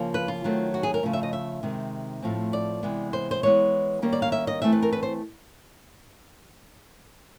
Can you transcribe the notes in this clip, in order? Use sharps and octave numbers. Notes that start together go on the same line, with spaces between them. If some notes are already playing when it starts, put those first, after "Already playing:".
Already playing: C#3 F3 A#3 C#4
B4
F4
D#3 F#3 A3 C4
F#4
G#4
A#4
C#3 F3 A3
E5
D#5
E5
C3 D#3 G#3 C4
A2 F3 A3 C4
D5
C3 E3 G#3 B3
C5
C5
E3 G#3 B3 C#5
D#3 G3 A#3 C#4
D5
F5
E5
D#5
E3 A3 C4 E5
B4
A#4
B4
C5